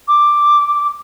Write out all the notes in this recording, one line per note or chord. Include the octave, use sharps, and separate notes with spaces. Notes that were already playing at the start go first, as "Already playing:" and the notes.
D6